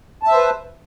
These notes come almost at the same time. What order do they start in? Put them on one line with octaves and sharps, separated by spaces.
A5 E5 C5 B4